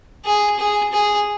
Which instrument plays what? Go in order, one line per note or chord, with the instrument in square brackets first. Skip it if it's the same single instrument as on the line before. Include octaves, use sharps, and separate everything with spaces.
[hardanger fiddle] G#4
G#4
G#4